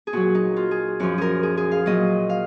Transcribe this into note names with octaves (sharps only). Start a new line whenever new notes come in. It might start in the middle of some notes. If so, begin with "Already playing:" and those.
G#4
A#2 F#3 F#4
D#4
F4
G#4
F#2 F3 F#4
G#4 A#4
G#4
G#4
F5
A#2 F#3 D#5
F5